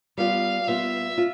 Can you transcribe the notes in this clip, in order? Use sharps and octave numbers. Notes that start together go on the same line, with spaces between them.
G3 B3 F4 F5
G3 B3 F4 E5
F4